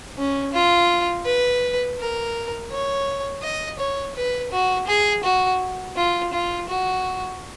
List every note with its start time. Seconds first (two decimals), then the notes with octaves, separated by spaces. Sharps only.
0.18 C#4
0.53 F4
1.25 B4
1.99 A#4
2.71 C#5
3.42 D#5
3.79 C#5
4.16 B4
4.52 F#4
4.87 G#4
5.24 F#4
5.96 F4
6.33 F4
6.69 F#4